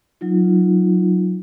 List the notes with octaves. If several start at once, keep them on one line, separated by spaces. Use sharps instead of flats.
F#3 D#4 F4